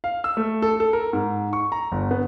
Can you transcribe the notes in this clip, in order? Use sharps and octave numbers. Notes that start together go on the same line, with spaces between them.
F5
E6
A3
A4
A4
A#4
G#2
C#6
A#5
G1
B3